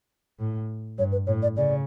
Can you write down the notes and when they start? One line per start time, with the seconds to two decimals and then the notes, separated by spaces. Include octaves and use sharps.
0.39 A2
0.98 G2 C#5
1.12 B4
1.27 A2 C#5
1.42 D5
1.57 C#3 D5